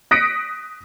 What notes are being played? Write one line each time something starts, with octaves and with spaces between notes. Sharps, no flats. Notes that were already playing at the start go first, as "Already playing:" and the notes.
D#6 F#6 A#6 B6 C#7 D7